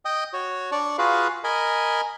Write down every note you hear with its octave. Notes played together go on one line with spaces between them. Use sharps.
D#5 G5 D#6
F#4 C#5
D4 D5 C#6
F4 F#4 G#4 B4 F5
A#4 D#5 G#5 B5